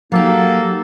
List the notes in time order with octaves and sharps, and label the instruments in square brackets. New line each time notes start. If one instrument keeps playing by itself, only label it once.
[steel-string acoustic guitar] F#3 G4 [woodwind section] A#3 D#4 A4